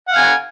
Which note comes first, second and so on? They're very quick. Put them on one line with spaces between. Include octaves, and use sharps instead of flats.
F#5 F5 G#5